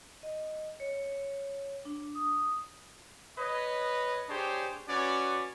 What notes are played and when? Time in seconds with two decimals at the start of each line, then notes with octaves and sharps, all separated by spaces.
0.23 D#5
0.80 C#5
1.85 D4
2.15 D#6
3.38 B4 C#5 D#5
4.29 D4 G4 G#4 C5 C#5
4.89 C#4 F#4 B4 C#5 D5